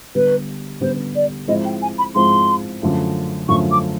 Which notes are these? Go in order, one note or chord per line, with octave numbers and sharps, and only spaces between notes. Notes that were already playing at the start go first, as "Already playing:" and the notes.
D3 G3 B3 B4
D3 G3 B3 C5
D5
G#2 F3 G#3 C4 E4 D#5
G5
G#5
B5
G#2 F3 G#3 C4 E4 C6
F#2 D3 F3 A3
F#2 D3 F3 A3 C#6
D6